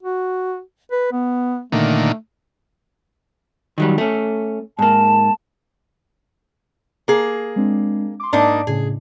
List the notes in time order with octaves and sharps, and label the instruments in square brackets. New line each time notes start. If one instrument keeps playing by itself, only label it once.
[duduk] F#4
B4
B3
[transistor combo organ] A#2 D3 D#3 [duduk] A3
[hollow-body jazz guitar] D#3 F#3 G3
A3 C#4
[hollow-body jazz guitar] G#2 A#3 [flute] A5
[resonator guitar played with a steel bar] A#3 G#4
[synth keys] G#3 C4 D4
C6 D6
[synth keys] G#2 [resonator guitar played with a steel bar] A#3 D4 D#4
[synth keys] A2 C#3 [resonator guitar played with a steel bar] G#4